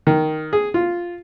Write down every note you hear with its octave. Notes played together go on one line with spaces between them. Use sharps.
D#3
G#4
F4